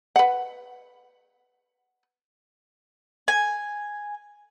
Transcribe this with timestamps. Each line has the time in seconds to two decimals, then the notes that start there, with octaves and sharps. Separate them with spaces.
0.16 B4 F#5
3.28 G#5